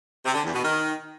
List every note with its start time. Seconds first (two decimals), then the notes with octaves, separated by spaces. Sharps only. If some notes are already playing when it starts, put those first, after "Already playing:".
0.24 C3
0.34 D3
0.44 E2
0.53 B2
0.63 D#3